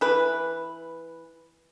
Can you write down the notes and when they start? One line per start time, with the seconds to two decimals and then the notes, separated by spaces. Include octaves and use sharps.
0.01 E3 B4